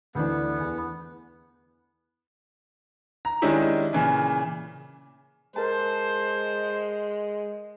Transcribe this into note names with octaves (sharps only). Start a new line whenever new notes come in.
D2 E3 B3 D4
E2
A#5
D#3 G#3 C#4 D4 E4 G4
A#2 C#3 E3
G#3 A#4 C5 A5